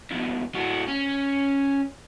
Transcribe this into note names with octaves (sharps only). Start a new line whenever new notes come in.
F2 B2
A2 F#4
C#4